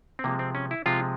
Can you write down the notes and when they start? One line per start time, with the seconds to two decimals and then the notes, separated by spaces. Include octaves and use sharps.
0.19 C4
0.24 C3 F3 G#3 A#3
0.39 C4
0.55 C#4
0.71 E4
0.86 C3 F3 G#3 F4